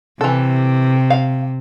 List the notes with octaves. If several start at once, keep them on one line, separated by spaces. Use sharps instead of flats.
C3 E3 A4
F5